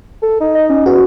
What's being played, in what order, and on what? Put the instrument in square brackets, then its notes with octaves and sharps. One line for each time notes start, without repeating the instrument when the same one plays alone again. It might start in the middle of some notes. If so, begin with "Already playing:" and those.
[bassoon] A4
D#4
[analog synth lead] D#5
C#4
[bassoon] E2 [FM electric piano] F#4